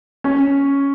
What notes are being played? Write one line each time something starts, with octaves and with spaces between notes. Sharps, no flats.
C#4